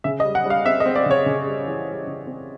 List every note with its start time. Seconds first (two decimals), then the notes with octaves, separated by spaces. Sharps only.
0.04 C#3 E5
0.20 D#5
0.25 G3
0.35 F#5
0.46 G3 F5
0.65 C4 E5
0.80 D#5
0.86 C4
0.95 D5
1.06 C#3 C#5
1.26 C#3
1.47 G3
1.66 E3
1.87 G3
2.07 C#3
2.27 C4